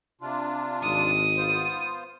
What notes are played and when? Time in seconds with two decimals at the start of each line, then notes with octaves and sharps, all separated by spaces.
0.21 C3 D4 F4
0.83 G#1 D#6
1.37 B3 F4 C5